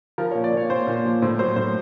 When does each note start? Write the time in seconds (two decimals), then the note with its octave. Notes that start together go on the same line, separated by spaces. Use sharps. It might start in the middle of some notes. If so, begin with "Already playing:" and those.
0.18 F3 A#4
0.31 C#5
0.35 A#2
0.44 D5
0.52 A#2 C#5
0.70 A#2 C5
0.87 A#2
1.05 F3
1.22 A2 C5
1.39 F#3 C5
1.56 A2 C5